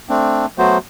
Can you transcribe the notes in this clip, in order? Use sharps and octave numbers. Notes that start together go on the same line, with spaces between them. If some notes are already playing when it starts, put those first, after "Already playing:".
A3 C4 D4
F#3 A3 B3 F#4 C5